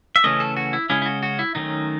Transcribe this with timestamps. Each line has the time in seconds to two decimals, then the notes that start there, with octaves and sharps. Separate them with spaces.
0.16 E5
0.24 C#3 E3 A3 C#4 D#5
0.40 A4
0.57 F#4
0.73 E4
0.90 C#3 G#3 C#4 E4
1.02 E4
1.06 F#4
1.23 F#4
1.39 E4
1.55 D#3 F#3 A3 C#4 D#4